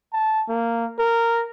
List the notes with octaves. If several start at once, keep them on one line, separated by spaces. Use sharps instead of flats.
A5
A#3
A#4